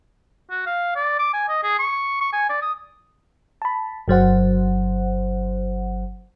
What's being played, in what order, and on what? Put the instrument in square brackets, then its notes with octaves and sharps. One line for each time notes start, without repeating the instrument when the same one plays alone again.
[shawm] F#4
F5
D5
D6
G#5
D#5
G#4
C#6
C#6
G#5
D5
D#6
[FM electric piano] A5 B5
G1 F#3 C5 F#5